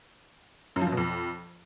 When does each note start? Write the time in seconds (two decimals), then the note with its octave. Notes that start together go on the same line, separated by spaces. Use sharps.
0.76 F#2
0.81 F3
0.87 F#2
0.92 B2
0.97 F2